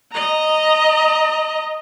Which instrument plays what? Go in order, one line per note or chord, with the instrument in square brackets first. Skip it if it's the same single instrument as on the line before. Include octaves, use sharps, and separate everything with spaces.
[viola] D#5 A#5